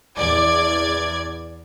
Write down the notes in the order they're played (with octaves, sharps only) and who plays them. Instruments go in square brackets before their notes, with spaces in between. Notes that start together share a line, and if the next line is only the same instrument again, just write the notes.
[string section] E2 D5 G#6